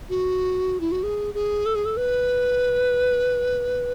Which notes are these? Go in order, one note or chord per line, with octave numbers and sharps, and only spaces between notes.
F#4
E4
F#4
G#4
G#4
A4
G#4
A4
B4